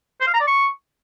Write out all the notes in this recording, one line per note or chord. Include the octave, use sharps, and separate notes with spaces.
C5
F5
A#5
D5
C#6